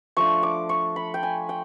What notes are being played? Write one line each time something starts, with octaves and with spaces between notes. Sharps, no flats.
F3 A3 D4 C#6
D6
C#6
B5
G5
G#5
G5